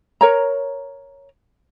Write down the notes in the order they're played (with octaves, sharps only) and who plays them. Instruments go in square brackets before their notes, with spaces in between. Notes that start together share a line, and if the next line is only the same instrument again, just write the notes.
[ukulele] A#4 C#5 A#5